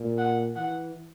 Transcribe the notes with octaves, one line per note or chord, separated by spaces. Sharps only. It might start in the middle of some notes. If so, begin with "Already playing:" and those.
Already playing: A#2
F#5
E3 F#5